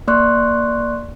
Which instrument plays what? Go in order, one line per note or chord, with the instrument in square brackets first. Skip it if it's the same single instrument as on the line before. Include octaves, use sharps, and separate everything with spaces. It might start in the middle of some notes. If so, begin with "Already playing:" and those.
[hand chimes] A#3 D5 C6 C#6 F#6